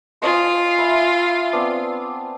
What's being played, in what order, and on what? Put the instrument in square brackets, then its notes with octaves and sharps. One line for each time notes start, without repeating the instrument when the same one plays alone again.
[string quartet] F4 [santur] C5 D#5 G#5
[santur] E5 B5
B3 C4 D4